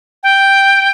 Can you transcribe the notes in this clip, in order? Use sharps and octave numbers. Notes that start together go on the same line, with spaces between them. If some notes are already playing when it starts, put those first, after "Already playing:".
G5